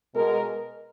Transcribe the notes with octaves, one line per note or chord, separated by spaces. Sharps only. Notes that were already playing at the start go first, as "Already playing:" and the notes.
B2 G#3 A#4